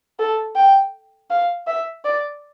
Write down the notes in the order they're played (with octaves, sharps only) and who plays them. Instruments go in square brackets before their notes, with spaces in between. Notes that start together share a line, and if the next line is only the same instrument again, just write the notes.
[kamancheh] A4
G5
F5
E5
D5